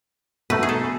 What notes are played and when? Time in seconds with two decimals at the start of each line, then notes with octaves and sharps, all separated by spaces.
0.50 B2 A3 D#4 B4
0.63 G#4
0.69 A4